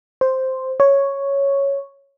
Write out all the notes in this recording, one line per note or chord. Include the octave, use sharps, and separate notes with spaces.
C5
C#5